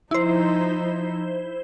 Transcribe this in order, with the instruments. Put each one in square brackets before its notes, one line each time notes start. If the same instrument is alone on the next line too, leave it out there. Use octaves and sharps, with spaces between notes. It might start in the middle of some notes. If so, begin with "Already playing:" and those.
[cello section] F3 D#4 [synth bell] E4 C5